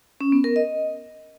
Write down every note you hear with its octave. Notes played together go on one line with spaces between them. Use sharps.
C#4
B3
A#4
D#5